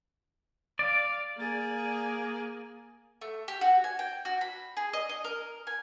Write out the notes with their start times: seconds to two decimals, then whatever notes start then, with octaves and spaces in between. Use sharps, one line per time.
0.79 D5 F5
1.37 A#3 G#4
3.22 A3
3.48 G4
3.61 F#4
3.84 G#5
3.99 G5
4.25 F#4
4.41 B5
4.77 G#4
4.93 D#5
5.09 D#5
5.24 A#4
5.67 G#5